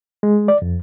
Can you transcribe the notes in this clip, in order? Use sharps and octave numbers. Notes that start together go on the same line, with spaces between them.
G#3
D5
F2